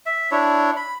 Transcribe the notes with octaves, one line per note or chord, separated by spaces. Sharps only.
E5
D4 E4 C#5
B5